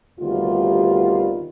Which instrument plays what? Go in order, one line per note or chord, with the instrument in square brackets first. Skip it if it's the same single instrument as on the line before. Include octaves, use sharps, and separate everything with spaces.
[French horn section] D2 C3 D#3 G3 B3 F4